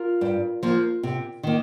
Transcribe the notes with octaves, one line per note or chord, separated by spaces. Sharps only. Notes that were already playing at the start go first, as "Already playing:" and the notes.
Already playing: F4 A#4
G2
F3 A#3
C3
D#3 A#3